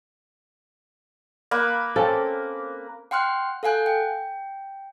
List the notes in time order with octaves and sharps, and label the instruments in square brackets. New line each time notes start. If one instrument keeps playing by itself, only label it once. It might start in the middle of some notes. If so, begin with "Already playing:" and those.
[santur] A#3 B4 B5
[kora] C4 C#4 A4 [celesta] C5 F5
[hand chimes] F#5 G5 C6 F6 F#6
A4 F5 F#5 G#5 F#6 G6
G5